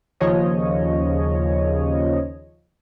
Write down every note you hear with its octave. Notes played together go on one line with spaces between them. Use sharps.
D#2 C#3 F3 C#5 D#5